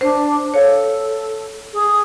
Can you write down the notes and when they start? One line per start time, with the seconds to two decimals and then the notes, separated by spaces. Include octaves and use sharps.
0.01 D4 C5
0.54 A4 C#5 F5
1.73 G#4